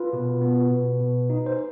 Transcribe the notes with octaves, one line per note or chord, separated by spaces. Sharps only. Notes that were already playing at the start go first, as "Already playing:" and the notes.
Already playing: F4 B4
B2
B3
B2
B2
D#4
C5